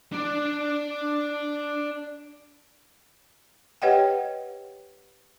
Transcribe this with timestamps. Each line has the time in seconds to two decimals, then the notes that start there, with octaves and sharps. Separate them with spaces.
0.12 D4 D5
3.82 G4 B4 C#5 D#5 F#5 G5